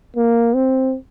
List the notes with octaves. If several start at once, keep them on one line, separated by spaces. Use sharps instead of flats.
A#3
C4